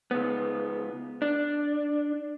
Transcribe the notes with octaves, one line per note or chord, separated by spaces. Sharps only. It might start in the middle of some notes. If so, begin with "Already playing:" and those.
C#2 B3
D4